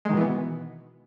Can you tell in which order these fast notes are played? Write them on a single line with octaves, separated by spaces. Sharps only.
G#3 D#3 B2 E3 B3